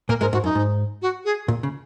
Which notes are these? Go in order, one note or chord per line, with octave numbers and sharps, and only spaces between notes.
A#2 A#3 A#4
G#2 G#3 A#4
G#2 F#4
F#2 D#4
G#2
F#4
G#4
A#2
C#3